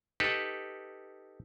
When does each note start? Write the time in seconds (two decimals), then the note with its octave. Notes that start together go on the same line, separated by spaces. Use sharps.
0.20 D#4 G4 A4 B4